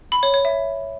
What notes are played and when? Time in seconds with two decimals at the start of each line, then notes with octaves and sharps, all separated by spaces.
0.12 B5
0.23 C#5
0.34 C#5
0.45 E5